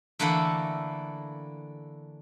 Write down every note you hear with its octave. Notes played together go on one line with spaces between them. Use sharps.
D3 E3 A3 A#3 E4 A4